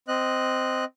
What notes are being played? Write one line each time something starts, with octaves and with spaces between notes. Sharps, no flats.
C4 D#5 F#6